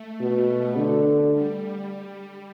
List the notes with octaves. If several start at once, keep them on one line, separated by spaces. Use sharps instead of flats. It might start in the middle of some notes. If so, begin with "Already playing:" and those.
Already playing: A3
B2
D3
G3